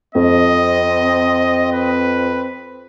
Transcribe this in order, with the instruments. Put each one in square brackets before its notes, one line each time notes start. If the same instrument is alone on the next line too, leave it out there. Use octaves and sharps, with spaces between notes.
[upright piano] F2 [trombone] C4 [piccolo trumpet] D#5
[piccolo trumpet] B4